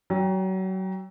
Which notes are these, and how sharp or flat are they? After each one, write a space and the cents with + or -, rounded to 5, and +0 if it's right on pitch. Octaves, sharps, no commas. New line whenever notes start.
F#3 +30 G5 +10